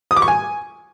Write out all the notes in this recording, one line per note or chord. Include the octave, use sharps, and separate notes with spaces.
D#6
D6
C#6
G#5